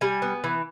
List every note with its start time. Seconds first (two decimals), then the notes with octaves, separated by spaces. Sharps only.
0.01 G3 G#5
0.22 B3
0.44 E3